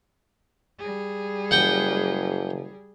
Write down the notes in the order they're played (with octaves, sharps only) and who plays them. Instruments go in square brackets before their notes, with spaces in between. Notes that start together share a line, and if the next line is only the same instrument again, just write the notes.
[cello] G3 G#4
[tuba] F#1 [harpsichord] F#5 G5